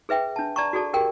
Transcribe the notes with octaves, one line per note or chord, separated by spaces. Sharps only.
G#4 B4 E5 G5
D4 A5
D5 A5 A#5 C#6
F#4 G#4 A4 D5 A5
G4 G#4 A#4 G5